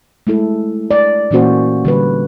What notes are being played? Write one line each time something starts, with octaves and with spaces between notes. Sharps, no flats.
G#3 A3 E4 A4
D5
A#2 E3 A#3 C#4 F#4 C5
D3 G3 B4